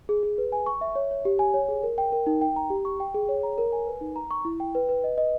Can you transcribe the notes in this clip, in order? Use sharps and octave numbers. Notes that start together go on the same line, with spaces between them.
G#4
G#4
B4
G#5
C#6
E5
C#5
C#5
G4
G#5
C#5
G#4
A#4
G5
A#4
D#4
G5
A#5
G4
C#6
G5
G#4
C#5
A#5
A#4
G#5
B4
D#4
A#5
C#6
E4
G5
B4
B4
D#5
D#5